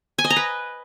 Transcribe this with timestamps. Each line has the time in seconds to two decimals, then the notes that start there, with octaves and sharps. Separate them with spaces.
0.18 G#5
0.24 D#5
0.30 A#5
0.36 B4